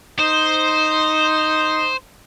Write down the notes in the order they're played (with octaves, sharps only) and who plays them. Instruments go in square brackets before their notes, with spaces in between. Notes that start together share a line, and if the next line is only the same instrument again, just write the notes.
[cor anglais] D#4 [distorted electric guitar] C5